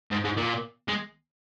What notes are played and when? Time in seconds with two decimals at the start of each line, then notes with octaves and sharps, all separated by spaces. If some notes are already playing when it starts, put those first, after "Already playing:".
0.11 G#2
0.24 G#2
0.37 A#2
0.88 G#3